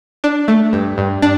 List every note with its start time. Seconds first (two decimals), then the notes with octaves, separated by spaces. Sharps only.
0.24 D4
0.48 A3
0.73 G2
0.98 G2
1.22 D4